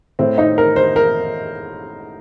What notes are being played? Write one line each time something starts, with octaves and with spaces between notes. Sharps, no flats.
A2 C4
D#4
A#4
C5
A#4